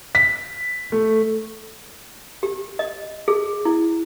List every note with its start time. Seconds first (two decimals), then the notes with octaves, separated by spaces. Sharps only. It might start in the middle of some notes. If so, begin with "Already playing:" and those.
0.15 B6
0.92 A3
2.43 G4
2.79 D#5
3.28 G#4
3.65 E4